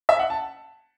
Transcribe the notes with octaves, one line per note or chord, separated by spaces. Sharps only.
E5
F#5
A5